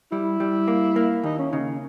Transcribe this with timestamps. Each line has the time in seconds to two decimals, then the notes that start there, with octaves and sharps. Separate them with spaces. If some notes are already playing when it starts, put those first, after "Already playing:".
0.12 G3 E4
0.40 G3
0.68 A#3
0.96 A#3
1.23 D#2 D#4
1.38 C#4
1.52 C#3 D#4